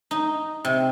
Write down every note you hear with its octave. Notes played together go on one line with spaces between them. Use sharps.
D#4
C3